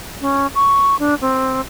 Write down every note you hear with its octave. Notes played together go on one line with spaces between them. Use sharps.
C#4
C#6
D4
C4